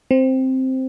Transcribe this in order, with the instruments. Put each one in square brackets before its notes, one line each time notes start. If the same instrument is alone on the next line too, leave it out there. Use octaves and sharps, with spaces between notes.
[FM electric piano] C4